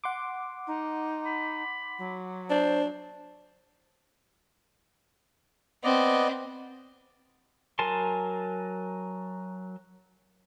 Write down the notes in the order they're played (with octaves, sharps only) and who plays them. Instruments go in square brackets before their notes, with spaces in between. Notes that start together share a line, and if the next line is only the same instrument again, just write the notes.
[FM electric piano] F#5 C6 D6
[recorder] D#4
[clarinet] B5
[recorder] F#3
[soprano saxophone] D4 [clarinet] C5
[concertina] B3 D5 D#5 [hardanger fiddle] C4
[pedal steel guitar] F#3 A#4 G#5 A5 C6